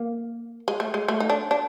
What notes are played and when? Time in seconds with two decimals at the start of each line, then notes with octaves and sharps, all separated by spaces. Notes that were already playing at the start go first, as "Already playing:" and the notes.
Already playing: A#3
0.68 G#3
0.80 A3
0.94 G#3
1.08 A3
1.20 D#4
1.30 D4
1.51 D4